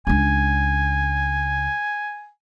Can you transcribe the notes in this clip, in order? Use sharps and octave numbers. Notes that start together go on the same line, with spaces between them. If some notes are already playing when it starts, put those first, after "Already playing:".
C#2 D4 G#5